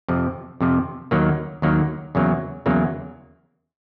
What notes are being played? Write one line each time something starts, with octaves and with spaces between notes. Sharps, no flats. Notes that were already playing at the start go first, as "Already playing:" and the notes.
F2 C3 F3
F2 C3 F3
D#2 D#3 F#3 A#3
D#2 D#3 F#3 A#3
E2 C#3 F#3 A#3
E2 C#3 F#3 A#3